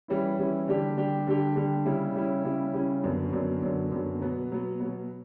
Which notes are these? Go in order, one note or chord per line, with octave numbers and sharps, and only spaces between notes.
E3 G3 C#4 E4
E3 G3 C#4 E4
D3 G3 D4 G4
D3 G3 D4 G4
D3 G3 D4 G4
D3 G3 D4 G4
C#3 G3 C#4 E4
C#3 G3 C#4 E4
C#3 G3 C#4 E4
C#3 G3 C#4 E4
F#2 D3 F#3 B3
F#2 D3 F#3 B3
F#2 D3 F#3 B3
F#2 D3 F#3 B3
B2 F#3 B3
B2 F#3 B3
B2 F#3 B3